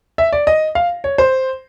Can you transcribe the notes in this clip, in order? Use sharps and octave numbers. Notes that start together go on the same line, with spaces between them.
E5
D5
D#5
F5
C#5
C5